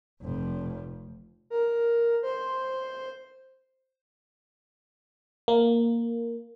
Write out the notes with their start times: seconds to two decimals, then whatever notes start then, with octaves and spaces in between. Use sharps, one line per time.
0.22 F1 F2
1.50 A#4
2.23 C5
5.48 A#3